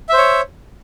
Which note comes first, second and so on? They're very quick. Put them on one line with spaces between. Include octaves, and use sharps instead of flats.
E5 C5 C#5